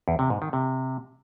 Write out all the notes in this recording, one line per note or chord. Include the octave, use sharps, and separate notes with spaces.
E2
C3
G#2
D#3
C3